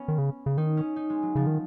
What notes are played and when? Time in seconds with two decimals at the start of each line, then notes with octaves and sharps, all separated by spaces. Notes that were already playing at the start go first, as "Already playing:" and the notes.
Already playing: B3 C#4
0.08 D#3
0.18 C#3
0.46 C#3
0.57 D#3 D#4
0.77 C#4
0.96 D#4
1.10 G#3
1.23 F#3
1.35 C#3 F3
1.47 D#3